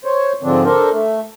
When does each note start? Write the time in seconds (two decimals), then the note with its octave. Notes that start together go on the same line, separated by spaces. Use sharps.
0.05 C5 C#5
0.43 G#2 D3 F3 C4 D4
0.65 D4 A4 A#4 C5
0.91 A3